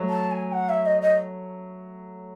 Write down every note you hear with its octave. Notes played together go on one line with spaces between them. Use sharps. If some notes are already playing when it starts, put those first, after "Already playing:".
Already playing: F#3 A3
A5
G#5
F#5
E5
D#5
D#5